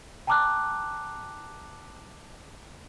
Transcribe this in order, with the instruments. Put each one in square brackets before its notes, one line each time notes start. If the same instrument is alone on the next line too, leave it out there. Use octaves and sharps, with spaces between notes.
[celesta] G5 A5 A#5 D6 F6 F#6